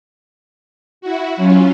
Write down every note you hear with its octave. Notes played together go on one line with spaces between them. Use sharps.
E4 F#4
F#3 C#4 F4